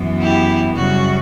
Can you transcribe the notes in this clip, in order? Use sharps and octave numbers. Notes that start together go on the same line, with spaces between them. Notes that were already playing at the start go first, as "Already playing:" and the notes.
Already playing: F#2 E3 B3
E4 G4
F#2 C#3 G3 F#4